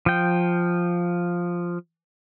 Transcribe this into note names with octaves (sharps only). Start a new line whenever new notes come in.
F3 G5